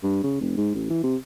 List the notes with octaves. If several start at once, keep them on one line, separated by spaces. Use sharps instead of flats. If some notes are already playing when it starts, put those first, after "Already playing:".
G2
C#3
F1
G#2
A1
E3
C3